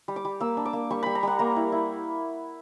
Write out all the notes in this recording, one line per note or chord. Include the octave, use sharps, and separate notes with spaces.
G3
D6
G3
A#3 E6
D4
D6
A#3
G3 C#6
G3 B5
A#5
G3 F#5
A#3 A#5
E4
E4